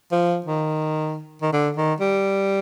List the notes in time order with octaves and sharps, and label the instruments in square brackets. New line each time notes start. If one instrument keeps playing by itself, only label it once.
[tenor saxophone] F3
D#3
D#3
D3
D#3
G3